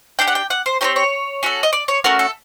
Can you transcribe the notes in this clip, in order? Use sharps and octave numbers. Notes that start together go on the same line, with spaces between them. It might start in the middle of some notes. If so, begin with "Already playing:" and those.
D4 G4 G5
F#5
G5
F#5
C5
C4 D#4 G4 C#5
C#5
C#4 F#4 A4
D#5
D5
C#5
A3 C#4 F#4 A#4
A4